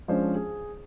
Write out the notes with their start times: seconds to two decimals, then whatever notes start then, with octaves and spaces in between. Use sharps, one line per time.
0.08 F3 G#3 C#4 D4 C5 D5
0.35 G#4